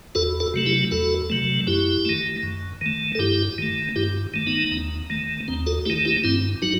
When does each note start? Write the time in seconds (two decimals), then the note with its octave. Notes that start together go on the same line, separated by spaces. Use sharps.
0.15 E2 F#4 A4
0.40 F#4 A4
0.54 C3 F#3 A3
0.66 E4 G4
0.91 E2 F#4 A4
1.30 C3 F#3 A3
1.67 F#2 E4 G4
2.05 D#3 A3
2.43 F#2
2.81 D#3 A3
3.15 A4
3.19 G2 E4 G4
3.58 D#3 A3
3.96 G2 E4 G4
4.34 D#3 A3
4.47 B3 D#4
4.71 D#2
5.10 D#3 A3
5.48 D#2 C4
5.66 F#4 A4
5.85 A3 E4 G4
5.90 D#3
6.05 E4 G4
6.24 G2 C4 E4
6.62 F#3 D#4 F#4